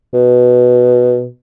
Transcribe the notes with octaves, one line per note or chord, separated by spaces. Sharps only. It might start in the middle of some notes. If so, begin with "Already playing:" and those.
B2